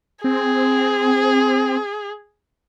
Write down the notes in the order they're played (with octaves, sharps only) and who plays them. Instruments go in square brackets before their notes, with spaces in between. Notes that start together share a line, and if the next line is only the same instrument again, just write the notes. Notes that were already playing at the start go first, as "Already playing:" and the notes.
[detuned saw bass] C4 [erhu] G#4